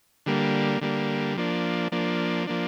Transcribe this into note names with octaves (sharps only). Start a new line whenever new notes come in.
D3 G3 A#3
D3 G3 A#3
F3 A#3 D4
F3 A#3 D4
F3 A#3 D4